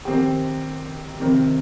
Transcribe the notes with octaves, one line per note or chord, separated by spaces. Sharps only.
D#3 C4 G4
C3 D#3 C4